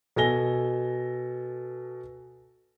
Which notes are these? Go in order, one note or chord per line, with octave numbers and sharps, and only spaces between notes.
B2 A4 G#5 A#6 G7